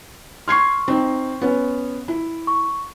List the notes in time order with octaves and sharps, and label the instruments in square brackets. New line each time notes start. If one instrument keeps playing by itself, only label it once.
[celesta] C6 C#6 [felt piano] F6 G#6 C7
[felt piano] C4 D#4
B3 C#4
E4
[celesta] C#6